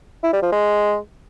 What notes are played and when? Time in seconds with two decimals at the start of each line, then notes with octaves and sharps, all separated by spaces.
0.23 E4
0.33 G3
0.42 F3
0.52 G#3